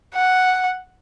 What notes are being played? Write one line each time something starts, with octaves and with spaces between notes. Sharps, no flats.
F#5